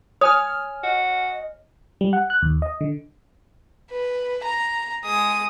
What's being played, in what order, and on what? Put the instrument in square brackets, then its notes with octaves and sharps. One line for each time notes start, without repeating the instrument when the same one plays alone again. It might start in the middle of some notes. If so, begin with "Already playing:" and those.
[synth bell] C#5 G#5 F6 [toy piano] D#6
[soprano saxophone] F#4 [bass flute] D#5
[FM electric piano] G3
F#5
F#6
D#2
D#5
D3
[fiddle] B4
A#5
G#3 D#6